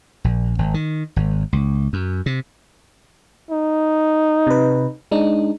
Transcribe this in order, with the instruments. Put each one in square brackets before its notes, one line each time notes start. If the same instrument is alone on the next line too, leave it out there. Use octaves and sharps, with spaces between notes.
[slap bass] A#1
G#1
D#3
G#1
C#2
F#2
C3
[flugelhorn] D#4
[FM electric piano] C3 B4
G#3 D4 D#4